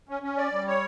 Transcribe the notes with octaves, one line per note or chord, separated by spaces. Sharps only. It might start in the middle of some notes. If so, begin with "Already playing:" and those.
C#4
C#4
D5
G3
C#5